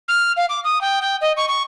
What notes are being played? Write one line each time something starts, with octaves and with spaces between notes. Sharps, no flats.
F6
F5
D6
D#6
G5
G5
D#5
C#6
C#6